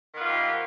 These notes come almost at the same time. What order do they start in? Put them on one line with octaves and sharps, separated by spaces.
D#3 B3 F4 A#3 C3